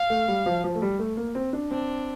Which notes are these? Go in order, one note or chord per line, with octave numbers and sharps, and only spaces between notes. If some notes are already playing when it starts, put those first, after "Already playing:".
Already playing: F5
A3
G3
F3
F3
A3
G3
A3
A#3
C4
D4
C4 D4